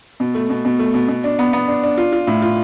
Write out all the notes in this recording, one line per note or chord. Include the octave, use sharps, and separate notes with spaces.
B2
A3
B2
B2
A3
B2
B2
D4
B3
B3
D4
D4
F4
F4
A2
F4